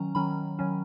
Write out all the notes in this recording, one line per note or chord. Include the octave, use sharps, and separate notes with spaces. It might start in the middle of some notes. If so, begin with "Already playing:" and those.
Already playing: D#3 F#3 C#4 A#5
D#3 F#3 C#4 B5
D#3 F#3 C#4